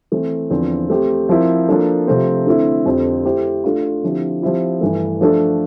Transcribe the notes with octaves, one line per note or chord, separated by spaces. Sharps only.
E3 A3 C4
E2 D3 F3 C4
A3 C4 G4
F3 C4 E4 A#4
F3 A#3 D4 A4
C3 F3 A3 C4
D3 A3 C4 E4
F2 D3 F3 C4 G4
A3 E4 G4 C5
A3 D4 F4
D3 F3 C4 E4 G4
F3 C4 E4 G4
G2 E3 A3
F3 A3 D4 A4